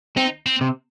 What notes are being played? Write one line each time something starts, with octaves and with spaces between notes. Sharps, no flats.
C4 D#4
C4
C3